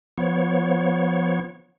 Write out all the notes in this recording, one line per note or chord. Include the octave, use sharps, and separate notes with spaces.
F3 B3 C#5